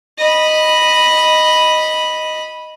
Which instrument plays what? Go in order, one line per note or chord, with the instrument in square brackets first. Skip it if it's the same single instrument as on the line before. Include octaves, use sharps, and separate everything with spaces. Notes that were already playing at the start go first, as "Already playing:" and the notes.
[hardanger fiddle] D#5 B5